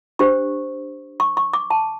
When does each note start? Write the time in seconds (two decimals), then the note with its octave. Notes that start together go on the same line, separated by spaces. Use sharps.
0.19 D4 G4 C5 C#6
1.20 C#6
1.37 C#6
1.53 D6
1.70 A5